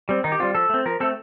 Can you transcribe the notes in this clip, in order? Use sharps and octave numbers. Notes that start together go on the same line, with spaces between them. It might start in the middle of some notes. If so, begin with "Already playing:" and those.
G3 C4
D#3 D#4
G4
G3 C4 F4
F3 A4
A3 C4
F3 A#4
A3 C4 A4